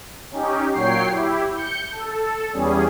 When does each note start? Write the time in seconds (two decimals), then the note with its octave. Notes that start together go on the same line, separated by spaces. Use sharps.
0.31 C#4 D#4 G4
0.73 A#2 F#3 C#5 G5 C7
1.11 E4 G4
1.54 G6 C#7
1.92 A4
2.53 E2 G3 C#4 G#4